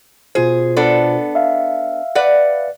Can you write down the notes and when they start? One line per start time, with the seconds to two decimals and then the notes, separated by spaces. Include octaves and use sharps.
0.35 B2 F4 G#4 C5
0.76 B3 D4 A4
1.35 E5 F5
2.15 B4 D5 F#5